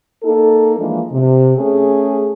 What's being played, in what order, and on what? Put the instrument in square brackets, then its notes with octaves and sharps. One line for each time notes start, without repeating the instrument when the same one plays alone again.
[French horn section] A#3 D#4 A4
E3 F3 G#3 A#3 D4
C3
A3 C#4 G#4